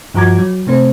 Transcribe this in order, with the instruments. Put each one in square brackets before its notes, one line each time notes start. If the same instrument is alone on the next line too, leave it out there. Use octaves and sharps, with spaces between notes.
[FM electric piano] G2 F3 F#4 A#5 D6 G#6
F#3
C3 A3 C4 C5